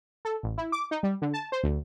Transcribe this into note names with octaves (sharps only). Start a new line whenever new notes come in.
A4
A1
E4
D6
D#4
G3
D3
A5
C5
D2